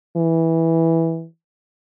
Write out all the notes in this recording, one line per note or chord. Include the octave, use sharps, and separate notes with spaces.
E3